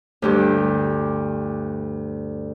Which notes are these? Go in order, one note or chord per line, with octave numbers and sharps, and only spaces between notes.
D2 G2 G4